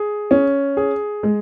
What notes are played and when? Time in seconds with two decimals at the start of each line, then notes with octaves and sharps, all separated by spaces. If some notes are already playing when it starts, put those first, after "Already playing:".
Already playing: G#4
0.31 C#4
0.77 G#4
1.23 G#3